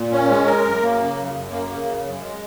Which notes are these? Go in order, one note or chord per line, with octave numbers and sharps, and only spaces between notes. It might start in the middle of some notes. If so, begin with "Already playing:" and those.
Already playing: A#2
C#4
G#3
A#4
F#2
A#3
C#3
F#2
F#2
A#3
C#3
F#2
F#2
G#3